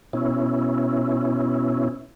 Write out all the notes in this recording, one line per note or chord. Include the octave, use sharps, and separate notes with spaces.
B2 C#4 E4